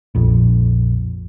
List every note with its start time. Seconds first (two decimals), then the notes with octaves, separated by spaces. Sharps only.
0.15 A#1 F2